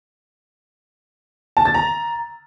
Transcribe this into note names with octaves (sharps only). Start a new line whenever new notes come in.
A5
A6
A#5